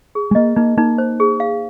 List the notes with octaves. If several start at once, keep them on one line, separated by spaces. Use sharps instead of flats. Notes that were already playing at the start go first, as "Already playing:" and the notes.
G#4
G#3
A#3 D#5
A#3 D#4
A#3 D#4
C5
G#4
F5